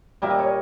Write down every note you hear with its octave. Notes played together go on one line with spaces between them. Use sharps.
A#2 G3 A#3 E5
D#5
C#5